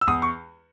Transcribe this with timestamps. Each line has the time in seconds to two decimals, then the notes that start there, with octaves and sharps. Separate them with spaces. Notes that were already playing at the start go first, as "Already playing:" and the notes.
0.01 E6
0.07 E2 D#6
0.22 C#6